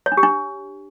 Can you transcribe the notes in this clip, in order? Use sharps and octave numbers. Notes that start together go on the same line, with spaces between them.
C#5
D4
G4
D4